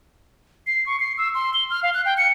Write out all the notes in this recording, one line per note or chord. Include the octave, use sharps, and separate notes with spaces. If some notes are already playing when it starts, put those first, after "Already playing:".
C7
C#6
C7
E6
C6
G7
F6
F5
F#6
G5
C#7